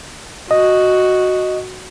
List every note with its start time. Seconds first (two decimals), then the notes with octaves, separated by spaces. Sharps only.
0.51 F#4 D#5